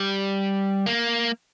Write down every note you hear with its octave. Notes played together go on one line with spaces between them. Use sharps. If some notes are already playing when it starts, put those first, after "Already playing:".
Already playing: G3
A#3